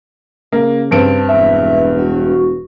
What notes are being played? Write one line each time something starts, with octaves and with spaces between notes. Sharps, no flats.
C#3 A#3
G2 C4 A5 D7
E1 E5
F#4